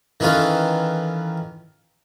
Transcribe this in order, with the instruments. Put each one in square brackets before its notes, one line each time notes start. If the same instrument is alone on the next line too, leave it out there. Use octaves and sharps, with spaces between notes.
[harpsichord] D#3 E3 C#4 F4 A4